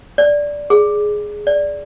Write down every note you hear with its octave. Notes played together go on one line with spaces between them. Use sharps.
D5
G#4
D5